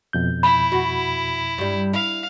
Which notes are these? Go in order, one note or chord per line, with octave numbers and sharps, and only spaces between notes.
F2 B2 G6
E4 B5
F#4
G2 G3
E4 F5